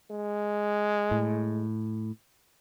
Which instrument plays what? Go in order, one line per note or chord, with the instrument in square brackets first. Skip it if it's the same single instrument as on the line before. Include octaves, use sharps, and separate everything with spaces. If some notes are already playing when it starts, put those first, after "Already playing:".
[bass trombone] G#3
[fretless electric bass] A2